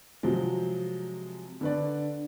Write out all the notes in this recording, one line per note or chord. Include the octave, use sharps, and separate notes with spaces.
C3 F3 F#3 G#3
D3 B4 D5